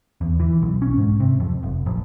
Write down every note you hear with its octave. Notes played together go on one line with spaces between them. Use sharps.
E2
E3
B1
C#4
G#2
C3
F2
F1
A#1